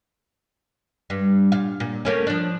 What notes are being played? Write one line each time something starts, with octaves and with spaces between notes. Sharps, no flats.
G2
A#2 F5
A#2
A3 A#3 C#4
F3 D4